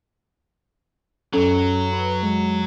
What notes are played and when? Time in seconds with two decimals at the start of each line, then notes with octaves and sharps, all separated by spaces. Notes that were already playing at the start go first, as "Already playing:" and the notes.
1.33 F#2 F#3 C#4 A4
1.93 B4
2.23 G#3